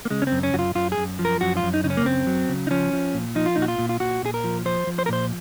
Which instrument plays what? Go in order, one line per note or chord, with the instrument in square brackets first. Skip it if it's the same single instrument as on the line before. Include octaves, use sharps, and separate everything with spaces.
[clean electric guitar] A#3
C#3 G#3
C#4
C4
F#2
C#4
F#2 F#4
F4
F#2 F4
G#4
F#2
F3
A#4
F#2 F#4
F4
F#2
D#4
C#3 D#4
C#4
A#3
F#2 C4
F#3
C#3
D#4
F3 C#4
F3
A#2
F3 D#4
F4
A#2 D#4
F#4
F4
A#2
F4
A#2 F#4
A#2 G#4
A#4
F3
F3 C5
F3
C5
A#4
A#2 C5